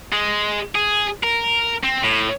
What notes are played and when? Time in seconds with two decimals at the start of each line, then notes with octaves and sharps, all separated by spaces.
0.13 G#3
0.75 G#4
1.23 A#4
1.84 C4
2.03 A2